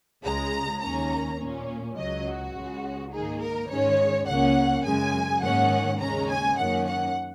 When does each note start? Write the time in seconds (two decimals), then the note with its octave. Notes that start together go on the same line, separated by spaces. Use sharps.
0.24 C#2 C#3 G#3 A#5
0.82 D#2 D#3 A#3 C#4 A#5
1.40 A#2 A#3 C#4
1.97 C#2 C#3 F#3 D#5
2.26 F#4
2.54 C#2 C#3 G#3 C#4
3.12 G#2 D#3 A#3 D#4 G#4
3.40 A#4
3.70 G#2 D#3 G#3 C#4 C#5
4.27 C#2 C#3 A#3 C#4 F#5
4.84 F#2 C#3 G#3 G#5
5.42 G#2 D#3 A#3 C#4 F#5
6.00 D#2 C#3 G#3 C#4 A#5
6.29 G#5
6.57 F#2 D#3 A#3 C#4 F#5
6.86 F#5